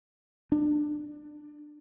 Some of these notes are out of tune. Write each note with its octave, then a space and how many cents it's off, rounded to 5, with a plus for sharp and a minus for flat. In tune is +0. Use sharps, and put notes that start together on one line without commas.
D4 +20